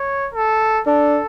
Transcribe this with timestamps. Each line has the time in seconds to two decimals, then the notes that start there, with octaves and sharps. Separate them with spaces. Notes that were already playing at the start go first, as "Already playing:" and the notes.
Already playing: C#5
0.34 A4
0.87 D4 A4